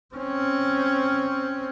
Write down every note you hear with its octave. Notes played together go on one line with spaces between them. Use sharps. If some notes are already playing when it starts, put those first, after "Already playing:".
C4 C#4